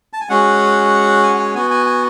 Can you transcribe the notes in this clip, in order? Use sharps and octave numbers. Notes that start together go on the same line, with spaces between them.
A5
G#5
G#3 C#4 F#4 F#5
G#5
F#5
G#5
B3 F#4 G#5
G#5
G#5